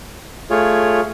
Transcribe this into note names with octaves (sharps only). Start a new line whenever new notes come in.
A3 F4 G#4 C#5